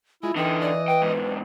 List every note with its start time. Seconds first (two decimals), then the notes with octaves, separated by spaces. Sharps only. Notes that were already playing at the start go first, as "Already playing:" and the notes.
0.23 G#3 E4 F4
0.36 D3 E3 D#4 D#5 G5
0.61 D5
0.88 B4 G5
1.02 E2 G#2